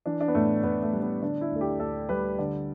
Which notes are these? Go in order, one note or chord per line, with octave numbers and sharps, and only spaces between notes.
E3 D4
D4
B3
A2 A3
A2 B3
A3
G3
B3
D3 D4
E4
D2 A4
G4
D2 A4
G3 B4
D3 D5